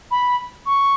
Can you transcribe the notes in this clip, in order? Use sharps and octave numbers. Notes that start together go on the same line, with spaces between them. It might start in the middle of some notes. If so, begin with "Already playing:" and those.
B5
C#6